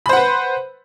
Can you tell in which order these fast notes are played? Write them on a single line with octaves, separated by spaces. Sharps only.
B5 C5 F#5 B4